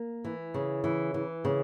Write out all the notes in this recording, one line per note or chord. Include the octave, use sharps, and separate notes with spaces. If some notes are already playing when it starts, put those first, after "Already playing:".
Already playing: A#3
E3
C#3
E3
E3
C#3